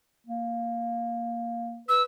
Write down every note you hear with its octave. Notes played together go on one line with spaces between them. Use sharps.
A#3
B4 E6